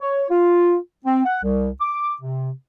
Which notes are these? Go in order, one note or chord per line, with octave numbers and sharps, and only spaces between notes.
C#5
F4
C4
F#5
C2
D6
C3